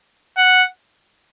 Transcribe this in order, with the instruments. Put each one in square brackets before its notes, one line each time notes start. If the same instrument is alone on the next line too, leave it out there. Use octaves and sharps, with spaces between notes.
[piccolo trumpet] F#5